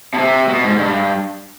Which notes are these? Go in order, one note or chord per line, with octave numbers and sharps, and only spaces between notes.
B2
C3
B2
G#2
G2